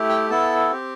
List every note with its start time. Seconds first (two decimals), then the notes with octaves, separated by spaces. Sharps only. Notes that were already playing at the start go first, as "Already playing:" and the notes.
Already playing: A3 E4 G4
0.09 G5
0.30 B3 E4 A4 A5
0.71 C4 G4